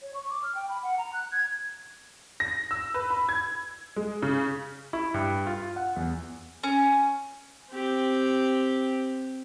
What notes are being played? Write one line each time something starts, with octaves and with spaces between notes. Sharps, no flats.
C#5
C#6
D6
F6
G5
B5
F#5
A#5
F#6
G#6
A#6
E6
B4
B5
G#6
G#3
C#3
E4
G2
F4
F#5
E2
C#4
C4 G4